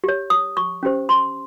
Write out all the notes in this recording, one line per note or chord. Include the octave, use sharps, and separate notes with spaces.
G4 C#5
D#6
C#6
C#4 G4 C5
C6